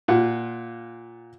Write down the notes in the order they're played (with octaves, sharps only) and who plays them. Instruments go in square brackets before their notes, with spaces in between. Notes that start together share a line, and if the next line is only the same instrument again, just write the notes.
[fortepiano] A#2 F4 F#5